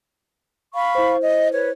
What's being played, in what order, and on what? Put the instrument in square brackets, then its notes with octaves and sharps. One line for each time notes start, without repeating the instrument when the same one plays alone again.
[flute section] F5 B5 C#6
[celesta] E4 C5
[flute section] D#5
B4 C#5